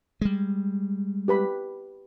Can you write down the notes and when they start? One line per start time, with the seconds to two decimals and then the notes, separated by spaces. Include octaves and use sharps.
0.21 G3 G#3
1.28 G4 B4 B5